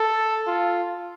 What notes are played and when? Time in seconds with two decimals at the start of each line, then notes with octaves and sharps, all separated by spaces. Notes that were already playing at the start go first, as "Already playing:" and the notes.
Already playing: A4
0.47 F4